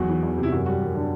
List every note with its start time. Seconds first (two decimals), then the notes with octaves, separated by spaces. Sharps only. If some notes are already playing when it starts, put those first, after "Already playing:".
Already playing: E2 F#3 F#4
0.09 E3
0.23 E2
0.38 C3
0.43 E4
0.52 F#2 F#4
0.66 G3 F#4
0.81 F#2
0.95 D3